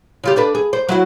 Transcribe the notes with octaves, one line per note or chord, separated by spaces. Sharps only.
C#3 F4 G4
D4 A4 B4
G#4
C5
F#3 E4 F#4